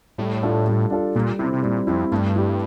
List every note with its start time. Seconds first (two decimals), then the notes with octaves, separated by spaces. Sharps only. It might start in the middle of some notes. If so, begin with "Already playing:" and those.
0.18 A2 G3
0.43 D4 F4 A4
0.67 G3
0.90 D4 F4 A4
1.15 A#2 G3
1.39 C3 C4 E4
1.53 C3
1.63 A#2 G3
1.87 F2 C4 E4
2.12 G2 A3
2.36 E4 G4